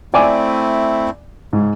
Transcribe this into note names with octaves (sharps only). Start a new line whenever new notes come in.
A3 C4 E4 D5 G#5 D6
G#2 C#3